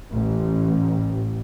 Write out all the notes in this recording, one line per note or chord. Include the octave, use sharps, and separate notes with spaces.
A1